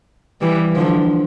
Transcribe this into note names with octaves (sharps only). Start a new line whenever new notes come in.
E3 G3
D3 F3